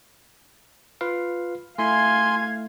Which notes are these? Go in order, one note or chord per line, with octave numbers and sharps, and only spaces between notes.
F4 B4 F5
A3 E4 F5 G#5 C6 G#6